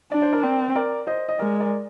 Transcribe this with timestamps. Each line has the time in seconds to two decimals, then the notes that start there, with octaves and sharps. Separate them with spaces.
0.12 D4 D5
0.22 C5
0.33 A#4 D5
0.43 C4
0.75 A#4 D5
1.07 C5 D#5
1.29 D#5
1.39 G#3 A#4 D5
1.60 A#4 D5